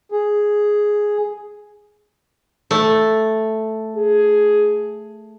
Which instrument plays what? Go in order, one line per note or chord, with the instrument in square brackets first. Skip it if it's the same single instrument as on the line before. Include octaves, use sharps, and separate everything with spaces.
[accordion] G#4
[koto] A3
[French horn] G#4